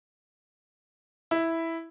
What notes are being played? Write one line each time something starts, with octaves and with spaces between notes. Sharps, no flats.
E4